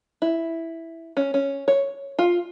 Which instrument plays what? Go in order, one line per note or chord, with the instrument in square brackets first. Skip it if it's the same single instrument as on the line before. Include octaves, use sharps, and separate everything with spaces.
[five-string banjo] E4
C#4
C#4
C#5
F4